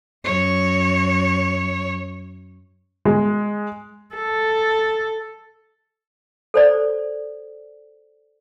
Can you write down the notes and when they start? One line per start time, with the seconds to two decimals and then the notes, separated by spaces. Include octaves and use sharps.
0.24 F#2 C#5
3.05 G#3
4.15 A4
6.54 A4 C5 D5